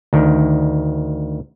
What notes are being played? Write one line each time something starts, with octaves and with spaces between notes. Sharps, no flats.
D2 D#3